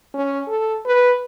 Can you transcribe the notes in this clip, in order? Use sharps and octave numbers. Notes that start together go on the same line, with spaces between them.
C#4
A4
B4